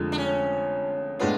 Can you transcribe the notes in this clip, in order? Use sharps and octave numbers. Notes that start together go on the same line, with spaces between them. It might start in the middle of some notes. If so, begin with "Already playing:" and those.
Already playing: F1 F2 D3 F3 G#3
D4
C#4
A2 G#3 B3 D4 F4